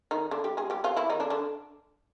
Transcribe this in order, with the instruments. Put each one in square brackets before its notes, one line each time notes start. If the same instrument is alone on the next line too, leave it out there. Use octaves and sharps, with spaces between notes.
[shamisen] D#3 D#4
D3 D4
G3 G4
G#3 G#4
G3 G4
F3 F4
E3 E4
D#3 D#4
D3 D4
D3 D4